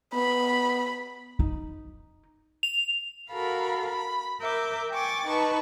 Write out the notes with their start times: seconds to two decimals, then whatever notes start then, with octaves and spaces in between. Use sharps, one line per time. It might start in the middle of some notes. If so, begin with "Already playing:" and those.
0.14 B3 B5
1.39 D#4
2.63 F7
3.32 F#4 A4 A#4 F5 B5
3.88 B5
4.41 A#4 E5 D6 G6
4.91 G5 G#5 C#6 D6 A6
5.27 D#4 B4 A5 C#6